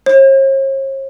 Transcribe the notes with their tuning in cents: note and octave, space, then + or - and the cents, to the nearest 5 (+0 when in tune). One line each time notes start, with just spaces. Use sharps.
C#5 -45